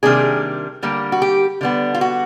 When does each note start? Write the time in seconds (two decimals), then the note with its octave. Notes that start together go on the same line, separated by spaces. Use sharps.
0.03 C3 D#3 G3 A#3 D4 G#4
0.83 D3 G3 A#3
1.12 F#4
1.22 G4
1.61 D3 G3 B3
1.94 F4
2.01 F#4